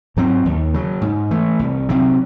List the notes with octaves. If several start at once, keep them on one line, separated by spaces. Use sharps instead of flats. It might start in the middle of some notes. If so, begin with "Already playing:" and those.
G#2 F#3 C4
D#2
C#3 F#3
G#2
E3 A3
C2
C3 F#3 C4